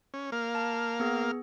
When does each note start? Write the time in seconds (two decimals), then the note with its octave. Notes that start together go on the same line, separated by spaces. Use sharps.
0.14 C#4
0.32 A#3 F5
0.55 A5
1.00 B3 G#4